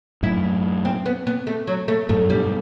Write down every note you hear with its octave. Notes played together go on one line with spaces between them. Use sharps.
F#2 A2 E4
C4
B3
B3
A3
F#3
A3
F#2 A2 A3
G2 B2 G3